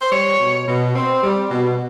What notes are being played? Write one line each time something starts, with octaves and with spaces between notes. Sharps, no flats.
C5
G3 C#5
B2
B2
C4
G3
B2